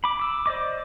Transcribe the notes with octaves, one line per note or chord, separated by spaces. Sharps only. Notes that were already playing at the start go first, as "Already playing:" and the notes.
B5 D6
D6 E6
C5 D5 D#5 D6